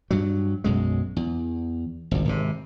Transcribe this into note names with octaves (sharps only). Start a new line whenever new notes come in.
G2 F#3
B1 F#2 G#3
E2
G#1 C#2
G#1 C3